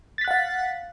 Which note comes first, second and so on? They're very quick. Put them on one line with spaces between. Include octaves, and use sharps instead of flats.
A6 B6 F#6 F#5 F5